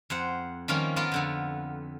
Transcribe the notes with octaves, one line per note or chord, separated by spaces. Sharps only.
F2 C5 F#5
D#3 F3 G3 A#3 C#4 F4
B3 F4 A#4 D5 D#5
F2 D3 B3